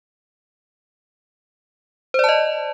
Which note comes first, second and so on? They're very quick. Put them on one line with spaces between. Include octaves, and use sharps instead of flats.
C5 D5 A5 D#5